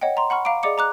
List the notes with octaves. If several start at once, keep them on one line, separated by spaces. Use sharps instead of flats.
C#5 D#5 F#5 G5
D#5 A#5 C6
F#5 B5 C#6 F6
F5 A#5 D6 D7
G#4 D5 D#5 D6 C#7
A#5 D6 F#6